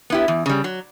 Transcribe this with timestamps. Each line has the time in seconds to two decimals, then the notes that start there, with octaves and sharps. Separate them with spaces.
0.10 B3 E4 G4
0.28 E2
0.46 C#3 G3
0.64 F#3